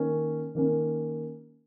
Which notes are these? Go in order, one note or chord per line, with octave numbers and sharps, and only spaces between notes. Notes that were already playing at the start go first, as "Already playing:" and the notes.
Already playing: D#3 A#3 C#4
D#3 A#3 C#4